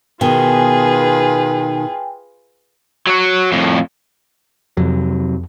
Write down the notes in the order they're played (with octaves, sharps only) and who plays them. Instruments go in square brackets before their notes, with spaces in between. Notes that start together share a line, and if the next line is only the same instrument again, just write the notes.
[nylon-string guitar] B2 D#3 [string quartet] F4 G#4 B4 [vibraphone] G5 G#5
[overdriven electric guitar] F#3 F#4
F2 A2
[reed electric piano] F2 [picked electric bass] C3 F#3